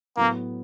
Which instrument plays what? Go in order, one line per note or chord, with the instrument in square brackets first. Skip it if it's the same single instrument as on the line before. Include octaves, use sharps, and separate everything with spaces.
[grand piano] A2 F#3 B3 [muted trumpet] A#3